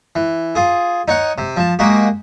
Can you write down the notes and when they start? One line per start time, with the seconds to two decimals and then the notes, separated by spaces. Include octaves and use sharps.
0.16 E3
0.55 F4 G#4
1.08 D#4 C#5 F#5
1.38 C3
1.56 F3 A5
1.79 G#3 A#3 F#4 G4